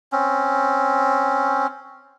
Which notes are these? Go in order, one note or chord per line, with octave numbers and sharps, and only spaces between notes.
C4 C#4